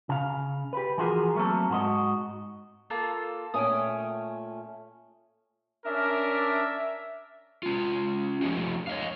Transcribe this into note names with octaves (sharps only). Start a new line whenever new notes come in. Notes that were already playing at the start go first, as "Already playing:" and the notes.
C#3 F5
G4 B4
E3 F3 F#4 G#4 A#4
F#3 A3 A#3 C4 A4
G#2 F#4 C5 D#5
A#3 F4 A4
A#2 A3 C#4 G5 G#5 D#6
C#4 D4 A#4 E5
C#4 F4
F3 G3 A3 D#4 G4
C#5 D#5 F5